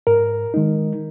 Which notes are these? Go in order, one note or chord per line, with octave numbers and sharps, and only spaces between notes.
G#2 A#4
D#3 G#3 D#4